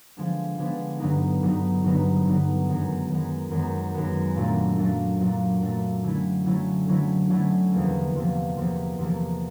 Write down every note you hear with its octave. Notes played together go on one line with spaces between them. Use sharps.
D3 F3 G#3 B3 D4
D3 F3 G#3 B3 D4
G2 D3 F#3 B3 D#4
G2 D3 F#3 B3 D#4
G2 D3 F#3 B3 D#4
G2 D3 F#3 B3 D#4
F#2 D#3 G#3 B3
F#2 D#3 G#3 B3
F#2 D#3 G#3 B3
F#2 D#3 G#3 B3
A#2 F#3 A3 D4
A#2 F#3 A3 D4
A#2 F#3 A3 D4
A#2 F#3 A3 D4
D3 F#3 A3 C#4 E4
D3 F#3 A3 C#4 E4
D3 F#3 A3 C#4 E4
D3 F#3 A3 C#4 E4
E2 C3 F3 A#3
E2 C3 F3 A#3
E2 C3 F3 A#3
E2 C3 F3 A#3